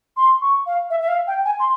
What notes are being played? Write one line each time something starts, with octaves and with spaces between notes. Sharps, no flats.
C6
C#6
F5
E5
E5
F5
G5
G#5
C6